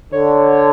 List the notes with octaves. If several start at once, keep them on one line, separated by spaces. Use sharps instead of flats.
D3 C#5